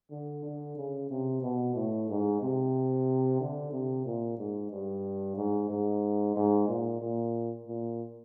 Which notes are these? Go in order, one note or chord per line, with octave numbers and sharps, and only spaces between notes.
D3
D3
C#3
C3
B2
A2
G#2
C3
D3
C3
A#2
G#2
G2
G#2
G#2
G#2
A#2
A#2
A#2